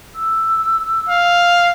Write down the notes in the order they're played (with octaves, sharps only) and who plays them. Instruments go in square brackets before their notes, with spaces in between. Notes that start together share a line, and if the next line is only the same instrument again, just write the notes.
[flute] E6
[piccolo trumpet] F5